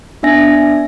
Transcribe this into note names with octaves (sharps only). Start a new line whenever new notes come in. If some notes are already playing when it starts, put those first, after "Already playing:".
B3 D4 E5 G#5 A#6